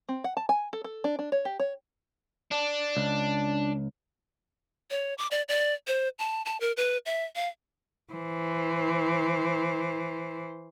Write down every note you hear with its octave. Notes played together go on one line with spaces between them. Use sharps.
C4
F#5
A5
G#5
A4
A4
D4
D4
C#5
G4
C#5
D4
C#2
C#5
D6
D5
D5
C5
A5
A5
A#4
B4
E5
F5
E3 C5